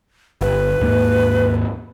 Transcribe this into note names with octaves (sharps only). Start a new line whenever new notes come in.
G1 B4
D#2 G#2 A#3